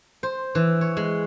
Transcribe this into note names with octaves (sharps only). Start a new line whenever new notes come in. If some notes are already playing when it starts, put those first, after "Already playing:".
C5
E3
C#5
G#3